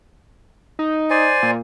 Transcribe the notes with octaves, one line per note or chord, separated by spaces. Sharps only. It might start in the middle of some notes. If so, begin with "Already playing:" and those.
D#4
C5 D5 G#5
A#2